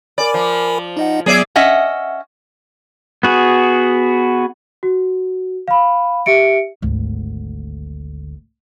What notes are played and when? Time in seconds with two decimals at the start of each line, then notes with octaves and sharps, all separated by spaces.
0.18 A#4 D5 G#5 B5
0.34 F3
0.97 D#4 D#5 F#5
1.26 F#3 B3 G#4 D5 E5
1.56 C#4 D#5 E5 F#5
3.23 B3 F#4 G#4
4.83 F#4
5.68 F5 B5
6.26 G4 E5 C#7 D7
6.82 G#1 D2